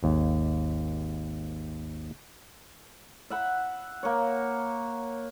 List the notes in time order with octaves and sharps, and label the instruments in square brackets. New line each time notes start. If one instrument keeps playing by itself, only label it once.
[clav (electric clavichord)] G#1 D#2
[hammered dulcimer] E5 F#5 B5
A#3 C#5